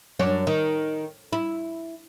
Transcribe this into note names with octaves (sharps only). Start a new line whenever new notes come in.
F#2 D4 C#5
D#3
E4